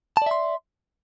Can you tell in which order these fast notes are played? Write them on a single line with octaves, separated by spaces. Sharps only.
A5 D5 E5 C6